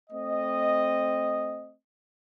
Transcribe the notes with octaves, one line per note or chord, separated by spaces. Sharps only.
A3 C4 D#5